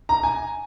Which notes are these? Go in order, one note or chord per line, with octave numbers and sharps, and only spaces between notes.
A#5
G#5